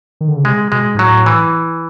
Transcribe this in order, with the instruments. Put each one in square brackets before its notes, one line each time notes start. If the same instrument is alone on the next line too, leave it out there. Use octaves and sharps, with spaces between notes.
[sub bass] D#3
D3
C#3
[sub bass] C3 [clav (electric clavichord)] G#3
[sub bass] B2 [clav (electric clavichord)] G#3
[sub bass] G#2
[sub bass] A2 [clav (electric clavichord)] F#3
[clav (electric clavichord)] E3